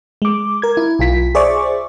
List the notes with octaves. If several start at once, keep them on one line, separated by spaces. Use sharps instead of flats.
G#3 D6
A#4 G#6
E4
B1 F4 B6
G#4 C5 D5 E5 C#6 D6